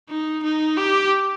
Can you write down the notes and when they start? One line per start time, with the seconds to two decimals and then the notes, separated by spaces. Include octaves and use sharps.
0.09 D#4
0.43 D#4
0.77 G4